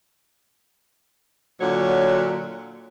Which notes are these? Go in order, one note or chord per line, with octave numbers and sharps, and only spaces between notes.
A#2 D3 F#3 C#5